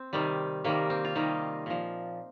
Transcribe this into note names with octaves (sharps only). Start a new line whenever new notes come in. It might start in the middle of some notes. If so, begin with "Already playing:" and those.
Already playing: C4
C3 D#3 G3
C3 D#3 G3 A#3
C4
F4
C3 D#3 G3 D#4
A#2 F3